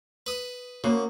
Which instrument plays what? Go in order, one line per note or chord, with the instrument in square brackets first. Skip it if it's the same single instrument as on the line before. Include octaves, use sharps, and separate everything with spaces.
[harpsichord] B4 D#6
[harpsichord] C#3 [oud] A#3 F#4 C5